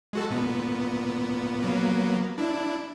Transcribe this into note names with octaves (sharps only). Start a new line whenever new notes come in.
G#3 F#4 A4
A#2 B3
F#3 A#3 B3
D4 E4